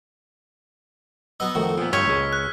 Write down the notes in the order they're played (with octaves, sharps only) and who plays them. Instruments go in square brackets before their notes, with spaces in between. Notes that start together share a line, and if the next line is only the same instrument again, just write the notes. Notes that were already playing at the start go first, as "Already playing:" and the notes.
[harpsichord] F#3 B3 D#5 [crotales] E6
[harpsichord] F2 A2 D#3 [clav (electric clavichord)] F#4
[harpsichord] A#2 [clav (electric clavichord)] F3 B3
[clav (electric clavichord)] G2 D#5 G5 [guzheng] C#5 [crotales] F6 B6
[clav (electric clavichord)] C#2 G#3
[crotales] F#6